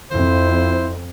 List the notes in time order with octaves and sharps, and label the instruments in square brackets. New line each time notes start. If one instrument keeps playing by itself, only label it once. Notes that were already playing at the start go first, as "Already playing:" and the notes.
[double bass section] F2 [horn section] E4 C5